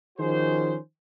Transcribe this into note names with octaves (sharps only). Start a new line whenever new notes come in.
D#3 F3 C#4 F#4 G#4 C5